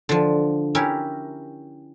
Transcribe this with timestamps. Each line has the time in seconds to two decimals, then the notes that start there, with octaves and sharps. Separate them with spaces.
0.09 D3 F3
0.75 C#4 E4 G4 A#4